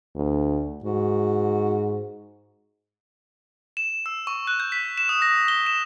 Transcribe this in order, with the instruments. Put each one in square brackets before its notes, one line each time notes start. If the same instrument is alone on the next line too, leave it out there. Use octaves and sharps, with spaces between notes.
[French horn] D2
[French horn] G#2 [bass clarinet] F#4
[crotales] E7
E6
C#6
F#6
G6
B6
E7
D#6
A#6
G7
E7